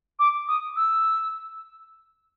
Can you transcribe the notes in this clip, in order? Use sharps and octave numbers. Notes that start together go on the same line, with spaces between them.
D6
D#6
E6